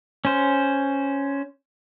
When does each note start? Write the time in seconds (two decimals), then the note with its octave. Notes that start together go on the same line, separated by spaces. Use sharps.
0.25 C#4 C5